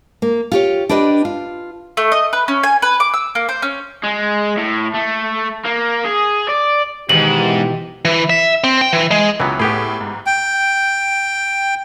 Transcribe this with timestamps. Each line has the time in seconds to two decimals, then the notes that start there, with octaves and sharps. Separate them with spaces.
0.22 A#3
0.52 F4 G4 C#5
0.89 D4 G4 B4 D5 D#5
1.25 F4
1.97 A3
2.12 D#5
2.33 B4
2.48 C#4
2.63 G#5
2.82 B4
3.00 D6
3.14 E6
3.35 A#3
3.49 C5
3.62 C#4
4.03 G#3
4.58 A2
4.95 A3
5.65 A#3
6.05 G#4
6.49 D5
7.09 E2 G#2 B2 D#3 E3 G4 F#7
8.05 E3
8.30 E5
8.64 C4
8.81 G5
8.93 E3
9.11 G#3
9.40 C#2 E3 F#3 B3
9.59 A2 B3 G4 G#4
10.01 G#2
10.26 G5